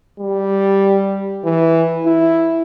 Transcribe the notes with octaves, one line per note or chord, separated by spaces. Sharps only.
G3
E3
E4